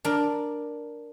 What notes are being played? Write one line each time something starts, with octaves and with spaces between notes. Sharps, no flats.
D4 A#4